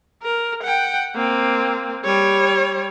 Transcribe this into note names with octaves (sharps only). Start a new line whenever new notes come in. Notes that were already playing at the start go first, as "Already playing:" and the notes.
A#4
F#5 G5
A#3 C4
G3 C#5